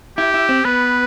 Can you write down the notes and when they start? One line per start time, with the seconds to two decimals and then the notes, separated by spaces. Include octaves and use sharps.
0.17 E4 G4
0.34 E4
0.49 C4
0.65 B3 B4